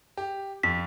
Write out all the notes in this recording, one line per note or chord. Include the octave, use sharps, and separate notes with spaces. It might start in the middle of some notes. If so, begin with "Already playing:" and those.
G4
F2 B6